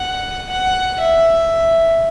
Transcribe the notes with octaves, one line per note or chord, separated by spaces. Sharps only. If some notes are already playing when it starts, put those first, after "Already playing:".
Already playing: F#5
F#5
E5